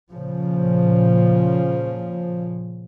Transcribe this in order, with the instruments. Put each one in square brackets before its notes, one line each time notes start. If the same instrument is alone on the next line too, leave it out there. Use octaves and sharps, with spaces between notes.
[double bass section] A#2 C#3 F3